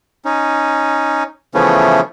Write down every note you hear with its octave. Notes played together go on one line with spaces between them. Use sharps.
C#4 D#4
C#3 E3 F3 A3 B3 C#4